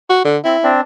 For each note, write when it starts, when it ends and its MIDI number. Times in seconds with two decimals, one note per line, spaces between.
0.10 0.24 66
0.25 0.38 50
0.44 0.56 60
0.44 0.69 64
0.63 0.81 60
0.63 0.81 62